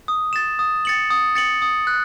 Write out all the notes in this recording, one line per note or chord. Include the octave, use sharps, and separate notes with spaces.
D#6
A6 E7
D#6
A6 C#7 F#7
D#6
A6 C#7 F#7
D#6
F#6